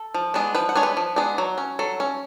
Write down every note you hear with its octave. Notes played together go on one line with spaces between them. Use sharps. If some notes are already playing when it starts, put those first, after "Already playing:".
Already playing: A4
F3
G#3 B3 D4
F3 B4
F#5
G#3 B3 D4 C#5
B4
F3
G#3 B3 D4
F#3
C#4
F#3 A4
C#4